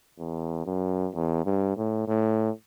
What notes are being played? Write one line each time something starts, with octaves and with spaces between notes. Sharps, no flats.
E2
F#2
E2
G2
A2
A2